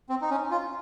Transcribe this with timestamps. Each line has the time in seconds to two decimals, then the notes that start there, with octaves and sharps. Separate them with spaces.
0.09 C4
0.22 D#4
0.30 C#4
0.51 F4